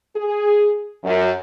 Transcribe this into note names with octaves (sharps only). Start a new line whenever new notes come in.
G#4
F#2